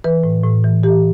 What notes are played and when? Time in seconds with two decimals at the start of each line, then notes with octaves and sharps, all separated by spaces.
0.04 E3 B4
0.24 A2
0.44 A2
0.64 E3
0.83 E3 G4